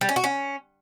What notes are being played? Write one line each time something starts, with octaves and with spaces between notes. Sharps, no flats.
G3
C#4
F#4
C#4